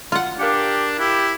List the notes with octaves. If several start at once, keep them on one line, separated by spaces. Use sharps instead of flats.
F4 F#5
D4 G4 A#4 F5 C#7
E4 G4